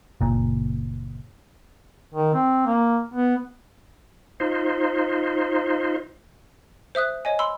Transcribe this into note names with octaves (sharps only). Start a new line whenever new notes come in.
F#1 A#2
D#3
C4
A#3
B3
D#4 F4 C5
C5 E5 D#6 F#6
C#5 D#5 G#5
B5 C6 E6